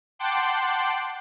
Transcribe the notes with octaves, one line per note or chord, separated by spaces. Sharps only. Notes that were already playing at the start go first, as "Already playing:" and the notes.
F#5 G5 A5 C6 D6 F#6